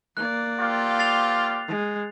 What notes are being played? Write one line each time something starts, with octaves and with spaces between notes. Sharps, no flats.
A#3 D5 F#6
C4 F4 G4
A6 C7 F7
G#3